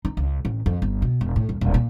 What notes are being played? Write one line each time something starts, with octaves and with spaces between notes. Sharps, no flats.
D#4
C#2
A1
F2
G1
B2
E1
A2
D#1
D#1
A#2